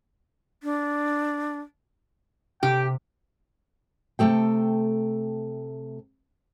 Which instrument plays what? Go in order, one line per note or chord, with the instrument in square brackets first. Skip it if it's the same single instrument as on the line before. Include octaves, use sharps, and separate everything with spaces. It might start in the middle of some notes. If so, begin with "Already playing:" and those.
[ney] D4
[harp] C3 [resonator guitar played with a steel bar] G4 [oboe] G5
[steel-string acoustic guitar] C3 F#3 A3 A4 G5